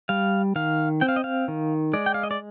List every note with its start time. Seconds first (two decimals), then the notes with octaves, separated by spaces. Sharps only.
0.09 G3 F5
0.56 D#3 F5
1.01 C4 G5
1.09 F5
1.16 D#5
1.24 F5
1.48 D#3
1.93 G#3 D5
2.06 G5
2.14 F5
2.23 D#5
2.31 D5